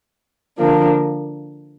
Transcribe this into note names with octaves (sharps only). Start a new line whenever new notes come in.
D3 F3 A#3 D4